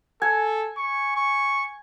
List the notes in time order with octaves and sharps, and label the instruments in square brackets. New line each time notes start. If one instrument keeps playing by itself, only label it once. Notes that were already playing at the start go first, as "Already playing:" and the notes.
[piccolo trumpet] A4 [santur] G#5
[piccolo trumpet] C#6
C#6